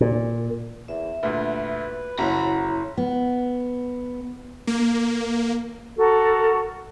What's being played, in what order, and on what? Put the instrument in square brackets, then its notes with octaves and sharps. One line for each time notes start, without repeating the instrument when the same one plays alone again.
[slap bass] A#2
[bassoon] E2 [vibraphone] E5
[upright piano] D2 A#2 [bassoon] B4
[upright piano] F#1 [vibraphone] E4 C#5 [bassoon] F#4 [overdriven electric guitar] A#5 B5
[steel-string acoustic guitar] B3
[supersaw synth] A#3
[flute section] F#4 A4 A#4